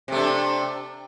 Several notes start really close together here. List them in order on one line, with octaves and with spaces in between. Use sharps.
C3 A3 D4